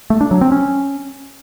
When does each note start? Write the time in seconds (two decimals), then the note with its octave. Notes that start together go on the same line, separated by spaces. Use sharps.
0.10 A3
0.21 D4
0.31 F#3
0.41 C4
0.52 C#4